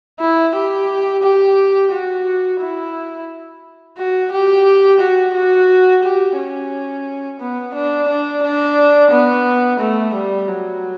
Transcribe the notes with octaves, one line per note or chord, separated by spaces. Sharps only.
E4
G4
G4
F#4
E4
F#4
G4
F#4
F#4
G4
C#4
B3
D4
D4
D4
B3
A3
G3
F#3